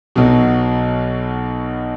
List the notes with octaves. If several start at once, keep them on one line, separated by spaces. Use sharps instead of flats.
B1 B2 F#3